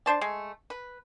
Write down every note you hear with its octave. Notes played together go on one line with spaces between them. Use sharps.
D4 C5 A5
G#3 A3
B4